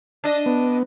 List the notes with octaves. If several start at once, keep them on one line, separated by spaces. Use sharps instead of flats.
D4 D#5
B3